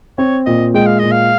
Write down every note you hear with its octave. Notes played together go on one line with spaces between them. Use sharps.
C4 C#5
A#2 D#5
G#3 G5
F5
A#2 D#5
F5